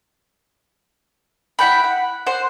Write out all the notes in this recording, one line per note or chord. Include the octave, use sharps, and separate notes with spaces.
E4 F#5 G5 B5
F#5
C5 F#5